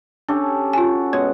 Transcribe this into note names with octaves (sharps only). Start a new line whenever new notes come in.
C#4 D4 G4 A4
F4 F#4 G#5
B2 G#3 C#5 F#5